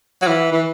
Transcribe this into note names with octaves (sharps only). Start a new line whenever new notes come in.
F#3
E3
E3